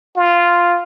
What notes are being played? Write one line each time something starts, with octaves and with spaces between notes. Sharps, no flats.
F4